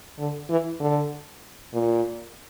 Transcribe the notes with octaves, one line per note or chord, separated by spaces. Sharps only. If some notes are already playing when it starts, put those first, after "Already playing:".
D3
E3
D3
A#2